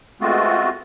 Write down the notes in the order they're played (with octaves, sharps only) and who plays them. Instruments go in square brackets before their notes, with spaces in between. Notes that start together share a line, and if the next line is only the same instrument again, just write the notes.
[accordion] G#3 A3 B3 C4 F4 F#4